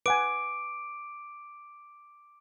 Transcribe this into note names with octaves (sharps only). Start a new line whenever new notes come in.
B4 F#5 G#5 D6 D7